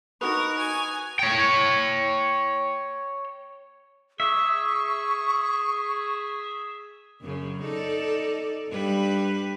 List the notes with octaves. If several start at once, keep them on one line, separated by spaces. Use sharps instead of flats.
D#4 F#4 A#4 B4 C#6 D#6 F#6 F7
G#5
C#5 G5
G#4 E5 C#6
F#2 C#3
D#4 A4 D5
G2 G3 B4